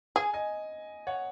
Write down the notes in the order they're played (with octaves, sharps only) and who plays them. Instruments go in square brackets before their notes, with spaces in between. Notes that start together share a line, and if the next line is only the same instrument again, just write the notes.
[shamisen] G#4 [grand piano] G#5
[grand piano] D#5 G#5
C#5 F#5